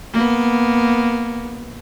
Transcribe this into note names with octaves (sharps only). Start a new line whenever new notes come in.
A#3 B3